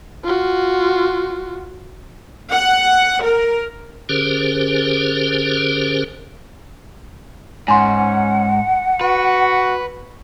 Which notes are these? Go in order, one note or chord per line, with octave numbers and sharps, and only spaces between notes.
F4 F#4
F#5
A#4
D3 C#4 G4 G#4 A#4 C5
G#2 C#4 F#5 G#5 C6
F#4 B4